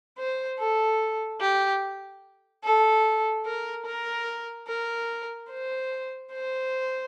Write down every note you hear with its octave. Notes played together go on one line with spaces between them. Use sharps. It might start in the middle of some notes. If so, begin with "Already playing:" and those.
C5
A4
G4
A4
A#4
A#4
A#4
C5
C5